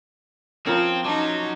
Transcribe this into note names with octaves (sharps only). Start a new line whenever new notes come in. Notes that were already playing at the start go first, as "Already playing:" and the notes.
F3 C4 C#4 A#4 C#5 A#5
F#3 C#4 D#4 A5 D6